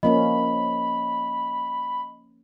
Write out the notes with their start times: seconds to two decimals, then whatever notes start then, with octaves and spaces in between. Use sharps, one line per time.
0.03 F3 A#3 C#4 D#5 B5